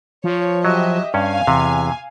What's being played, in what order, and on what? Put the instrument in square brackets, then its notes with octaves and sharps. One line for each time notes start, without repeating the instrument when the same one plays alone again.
[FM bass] F3 [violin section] C#5
[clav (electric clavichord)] F#3 [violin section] G4 D#5 E5
[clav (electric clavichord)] G2 C#4 [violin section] F5 G#5
[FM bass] E2 [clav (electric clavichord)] C3